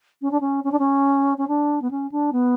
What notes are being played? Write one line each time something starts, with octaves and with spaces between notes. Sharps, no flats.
C#4
D4
C#4
C#4
D4
C#4
C#4
D4
B3
C#4
D4
B3